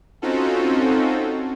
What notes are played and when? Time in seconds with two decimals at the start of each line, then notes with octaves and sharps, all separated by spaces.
0.22 C4 C#4 D#4 F4 F#4 A4